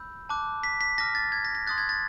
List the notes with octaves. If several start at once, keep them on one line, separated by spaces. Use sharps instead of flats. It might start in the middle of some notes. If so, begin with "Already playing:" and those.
Already playing: B5 E6 G6
A5 D6 F#6
B6
B6
A5 D6 F6 A#6
A6
G#6
A#6
A#6
C6 D#6 F#6 A6
G#6
A6